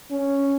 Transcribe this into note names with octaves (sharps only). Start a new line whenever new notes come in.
C#4